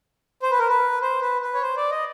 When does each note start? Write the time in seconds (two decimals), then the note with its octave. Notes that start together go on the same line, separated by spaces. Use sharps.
0.42 C5
0.51 B4
0.59 A#4
0.68 B4
1.02 C5
1.21 B4
1.42 B4
1.54 C#5
1.62 C5
1.77 D5
1.91 D#5